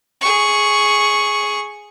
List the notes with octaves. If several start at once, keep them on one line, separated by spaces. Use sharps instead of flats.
G#4 C#6